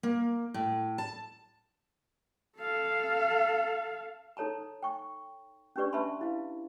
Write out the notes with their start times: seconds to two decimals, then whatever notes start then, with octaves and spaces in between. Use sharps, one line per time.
0.03 A#3
0.54 A2
0.98 A5
2.57 A4 F5
4.37 D#4 A4 C#5 A5 A#5
4.83 G5 C#6
5.76 C#4 D4 G4 B4 D5 C#6
5.93 D4 B4 E5 A5 B5 C6
6.21 E4 F5